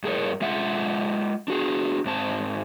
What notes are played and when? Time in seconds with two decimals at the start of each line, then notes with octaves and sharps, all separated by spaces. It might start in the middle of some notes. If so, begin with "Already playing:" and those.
0.04 G2 G#4 A#4 C#5
0.41 G#3 F4 E5 F#5
1.48 D4 F#4 G#4
2.05 G#2 C4 A5